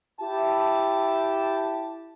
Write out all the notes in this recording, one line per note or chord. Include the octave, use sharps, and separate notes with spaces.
E4 G4 A5